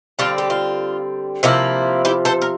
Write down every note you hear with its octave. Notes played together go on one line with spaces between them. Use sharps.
D3 G3 C4 F4
G4
F4
C3 F3 A#3 E4
E4 G4
A4 C5
A#4